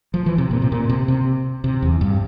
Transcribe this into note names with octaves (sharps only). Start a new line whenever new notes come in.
F3
E3
C3
A#2
C3
A#2
C3
C3
C3
E2
G2